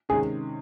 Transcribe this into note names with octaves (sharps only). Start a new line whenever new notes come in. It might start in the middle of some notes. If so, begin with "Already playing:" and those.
C3 D#3 G#3 C#4 G#4